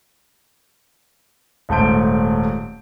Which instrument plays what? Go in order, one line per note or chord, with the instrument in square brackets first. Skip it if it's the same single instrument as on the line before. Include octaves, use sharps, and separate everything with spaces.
[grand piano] D#1 G#2 A3 G6 D7